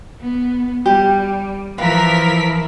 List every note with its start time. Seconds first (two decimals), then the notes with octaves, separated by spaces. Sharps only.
0.21 B3
0.86 G3 G4
1.78 E3 F3 E4 A#4 B4 F5 B6